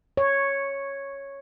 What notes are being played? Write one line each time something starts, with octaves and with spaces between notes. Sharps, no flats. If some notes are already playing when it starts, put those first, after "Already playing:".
C#5